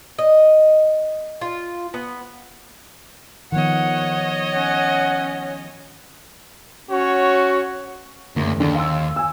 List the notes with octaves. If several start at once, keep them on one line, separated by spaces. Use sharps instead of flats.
D#5
F4
B3
D#3 F3 B3 C#5 D#5 F#5
C#4 F#5
C#4 F#4 C#5
F#1 D2
D#2 D3
F5 C6 E6
G#5 E6